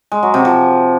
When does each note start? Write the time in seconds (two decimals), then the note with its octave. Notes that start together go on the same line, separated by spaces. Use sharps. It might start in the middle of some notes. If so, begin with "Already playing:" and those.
0.12 G#3
0.23 F#3
0.34 C3
0.45 F3